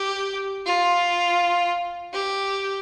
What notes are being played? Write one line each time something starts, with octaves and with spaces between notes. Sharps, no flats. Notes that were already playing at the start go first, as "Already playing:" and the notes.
Already playing: G4
F4
G4